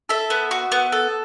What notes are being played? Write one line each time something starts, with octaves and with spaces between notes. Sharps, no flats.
A4 E5
B3
F#4
B3
A4